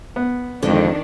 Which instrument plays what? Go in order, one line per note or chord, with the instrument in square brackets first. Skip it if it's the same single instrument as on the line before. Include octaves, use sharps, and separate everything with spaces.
[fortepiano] B3
[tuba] F2 [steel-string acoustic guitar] D3 G#3 C4 [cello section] D#3 D4